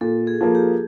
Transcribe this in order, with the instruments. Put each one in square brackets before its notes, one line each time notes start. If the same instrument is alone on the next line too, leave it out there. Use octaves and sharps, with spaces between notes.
[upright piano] A#2 [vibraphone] A4
[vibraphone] G#4
[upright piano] F3 A#3
[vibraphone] G4